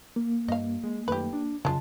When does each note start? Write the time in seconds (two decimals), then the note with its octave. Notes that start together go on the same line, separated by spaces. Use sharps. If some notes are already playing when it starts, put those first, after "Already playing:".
0.16 A#3
0.48 G2 D#5 F5
0.84 G#3
1.08 F#2 D#3 A3 G4 B4
1.33 D4
1.65 F#2 A2 C#3 G#3 F4 A5